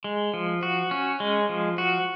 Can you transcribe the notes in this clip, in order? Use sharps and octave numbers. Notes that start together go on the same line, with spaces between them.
G#3
F3
F#4
C#4
G#3
F3
F#4